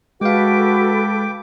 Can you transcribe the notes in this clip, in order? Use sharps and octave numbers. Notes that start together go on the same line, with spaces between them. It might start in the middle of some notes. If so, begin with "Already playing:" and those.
G#3 F#4 A4 B4 F5 G5 D6